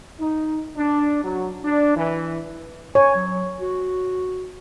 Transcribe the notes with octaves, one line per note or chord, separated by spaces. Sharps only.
D#4
D4
F#3
D4
E3
C#5 G#5
F#3
F#4